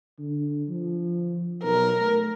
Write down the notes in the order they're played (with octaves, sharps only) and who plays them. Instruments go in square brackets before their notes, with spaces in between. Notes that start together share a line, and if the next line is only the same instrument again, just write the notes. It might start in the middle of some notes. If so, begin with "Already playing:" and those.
[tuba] D3
F3
[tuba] B1 [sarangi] A#4
[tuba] A3